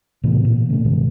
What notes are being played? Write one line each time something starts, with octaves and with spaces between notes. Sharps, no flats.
A2 C3 E3 B3
A#2
C#3 A3
G2 B2 D#3 G#3